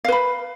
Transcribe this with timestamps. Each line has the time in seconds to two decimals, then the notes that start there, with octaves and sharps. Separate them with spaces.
0.05 F5
0.08 B4
0.12 B5